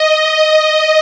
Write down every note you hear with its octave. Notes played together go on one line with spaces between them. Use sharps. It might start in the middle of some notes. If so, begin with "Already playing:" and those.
Already playing: D#5